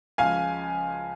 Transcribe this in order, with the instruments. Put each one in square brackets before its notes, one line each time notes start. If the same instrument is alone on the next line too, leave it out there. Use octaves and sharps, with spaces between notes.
[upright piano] C#2 C#3 F3 F5 G#5